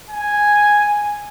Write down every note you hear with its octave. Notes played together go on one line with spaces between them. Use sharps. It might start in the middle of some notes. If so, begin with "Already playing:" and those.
G#5